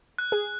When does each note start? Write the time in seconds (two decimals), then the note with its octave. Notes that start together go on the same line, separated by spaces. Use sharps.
0.18 F#6
0.32 G#4